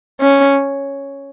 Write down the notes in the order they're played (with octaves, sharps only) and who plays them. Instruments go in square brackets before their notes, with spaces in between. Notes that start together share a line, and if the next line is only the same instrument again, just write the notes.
[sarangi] C#4